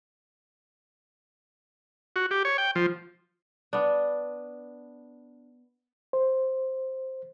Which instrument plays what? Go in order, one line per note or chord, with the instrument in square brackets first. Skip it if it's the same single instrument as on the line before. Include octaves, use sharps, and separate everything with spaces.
[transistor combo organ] F#4
G4
C#5
G5
F3
[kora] B3 D4
[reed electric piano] C5